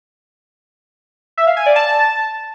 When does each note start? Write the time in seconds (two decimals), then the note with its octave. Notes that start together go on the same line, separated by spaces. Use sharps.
1.37 E5
1.47 F5
1.57 G#5
1.66 D5
1.76 A5